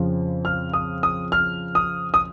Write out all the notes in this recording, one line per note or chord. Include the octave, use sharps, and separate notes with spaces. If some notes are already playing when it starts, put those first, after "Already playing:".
Already playing: F2 C#3 F3
F6
D#6
D#6
F6
D#6
D#6